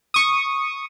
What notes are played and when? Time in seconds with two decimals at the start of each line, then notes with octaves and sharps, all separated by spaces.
0.14 C#6 D#6